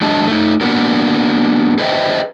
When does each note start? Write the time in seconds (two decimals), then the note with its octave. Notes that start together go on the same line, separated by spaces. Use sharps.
0.01 F#3 G#3 D4 G#4 D#5 A5
0.27 A3 D#4
0.61 A#3 B3 D4 F#4 A#4
1.78 G#4 B4 C5 D#5 E5 G5